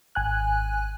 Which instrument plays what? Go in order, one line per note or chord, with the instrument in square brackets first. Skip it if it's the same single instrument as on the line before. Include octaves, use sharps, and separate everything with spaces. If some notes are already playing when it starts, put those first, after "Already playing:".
[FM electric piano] G#1 G#5 F#6